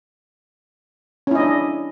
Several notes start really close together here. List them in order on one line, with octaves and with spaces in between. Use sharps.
C#4 E4 D#5 D4